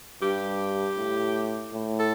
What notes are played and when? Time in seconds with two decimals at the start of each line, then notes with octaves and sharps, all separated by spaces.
0.21 G2 G4
0.97 A2
1.74 A2
1.99 A4